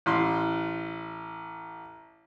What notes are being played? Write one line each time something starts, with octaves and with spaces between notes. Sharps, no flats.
A1 C6